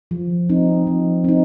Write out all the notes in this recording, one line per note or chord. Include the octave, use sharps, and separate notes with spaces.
F3
C4 D#4
F3
C4 D#4